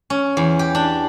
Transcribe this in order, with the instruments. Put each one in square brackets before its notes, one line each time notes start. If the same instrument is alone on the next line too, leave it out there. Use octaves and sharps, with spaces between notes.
[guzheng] C#4
E2
G4
D4